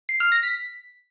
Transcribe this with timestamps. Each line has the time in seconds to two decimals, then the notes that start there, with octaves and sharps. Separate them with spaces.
0.09 C7
0.20 F6
0.32 A#6
0.43 B6